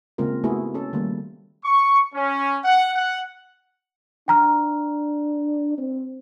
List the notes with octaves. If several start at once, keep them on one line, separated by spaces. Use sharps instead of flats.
C#3 G#3 A#3 C4 F4 A#4
A3 B3 E4 F#4 G#4
C#4 A4
D#3 G3 A3 A#3
C#6
C#4
F#5
F#5
D4 G5 A#5 F6
C4